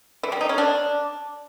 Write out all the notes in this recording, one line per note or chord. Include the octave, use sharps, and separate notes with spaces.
E3
G3
D#4
C#4
D4